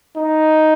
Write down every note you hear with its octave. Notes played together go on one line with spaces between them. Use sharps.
D#4